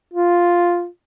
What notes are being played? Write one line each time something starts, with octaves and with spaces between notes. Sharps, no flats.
F4